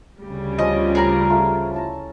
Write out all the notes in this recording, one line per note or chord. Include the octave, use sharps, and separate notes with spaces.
D2 C#3 G3
F3 C#4 F4 D#5
G#4 A#4 A#5
A3 F4
E4 A5 A#5